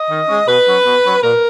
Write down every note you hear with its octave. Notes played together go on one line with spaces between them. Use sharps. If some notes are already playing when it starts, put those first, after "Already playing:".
Already playing: D#5
D#3
G#3 C#4
B2 B4
F#3 C#4
B2
F#3 C#4
A#2 A#4